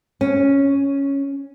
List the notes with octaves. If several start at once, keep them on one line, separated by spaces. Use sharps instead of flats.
C#4